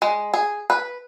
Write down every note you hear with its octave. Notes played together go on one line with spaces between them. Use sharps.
G#3
G#4
B4